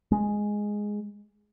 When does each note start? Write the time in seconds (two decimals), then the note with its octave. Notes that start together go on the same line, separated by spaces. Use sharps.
0.12 G#3